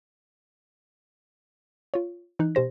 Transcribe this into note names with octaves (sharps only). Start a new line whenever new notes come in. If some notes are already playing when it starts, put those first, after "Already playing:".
F4 C#5
E3 D#4 F#6
B2 G4 C5 A#6